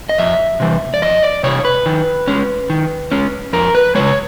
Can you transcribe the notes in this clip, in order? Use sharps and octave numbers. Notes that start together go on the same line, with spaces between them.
D#5
F2 E5
C3 E3 G3
D5
F2 D#5
D5
C3 E3 G3 C#5
B4
D#3
G#3 C#4
D#3
G#3 C#4
F2 A#4
B4
C#3 F3 G#3 C#5